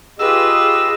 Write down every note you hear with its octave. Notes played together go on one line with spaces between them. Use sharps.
F4 G4 G#4 B4 D#5 E6